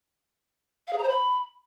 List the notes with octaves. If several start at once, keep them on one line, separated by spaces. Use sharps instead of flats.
F5
G#4
A#5
C5
B5